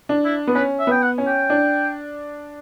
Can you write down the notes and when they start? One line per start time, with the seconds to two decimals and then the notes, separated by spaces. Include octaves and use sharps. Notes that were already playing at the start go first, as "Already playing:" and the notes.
0.09 D4
0.25 E4
0.47 B3
0.55 C#4 B4
0.79 E5
0.87 B3 G5
1.03 F#5
1.18 C#4
1.27 G5
1.50 D4